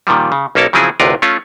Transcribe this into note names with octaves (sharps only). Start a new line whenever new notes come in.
A#2 D#3 F3 G3
C#3
B1 A#3 C#4 A4 A#4 A5
C#3 F3 F#3 C4 E4 G#4
A1 D2 C3 F4 A#4 B4
A3 C#4 F4